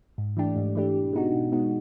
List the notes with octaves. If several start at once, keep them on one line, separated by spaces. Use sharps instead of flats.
G#2
E3 A3 D4 G4
G#2
E3 A3 D4 G4
B2
G#3 B3 D#4 F#4
B2
G#3 B3 D#4 F#4